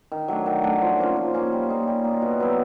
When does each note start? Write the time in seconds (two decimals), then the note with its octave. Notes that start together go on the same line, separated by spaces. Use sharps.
0.12 D#3
0.28 F#3 A3 D4
0.46 D#3
0.63 F#3 A3 D4
0.82 F3
0.99 A#3 C#4 F4
1.17 F3
1.34 A#3 C#4 F4
1.52 G3
1.70 A#3 D#4
1.87 G3
2.04 A#3 D#4
2.22 B2
2.40 F#3 B3 E4